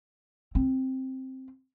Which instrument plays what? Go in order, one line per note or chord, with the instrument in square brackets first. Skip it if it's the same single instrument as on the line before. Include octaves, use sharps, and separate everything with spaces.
[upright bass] C4